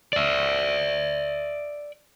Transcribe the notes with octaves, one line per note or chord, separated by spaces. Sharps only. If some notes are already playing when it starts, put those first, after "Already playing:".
D5 E5